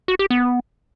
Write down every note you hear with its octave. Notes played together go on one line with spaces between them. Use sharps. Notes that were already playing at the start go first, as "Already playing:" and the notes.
F#4
G4
B3